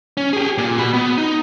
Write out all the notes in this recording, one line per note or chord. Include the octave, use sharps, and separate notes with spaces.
C#4
G4 G#4
A#2
F#4 B5
B3
D#4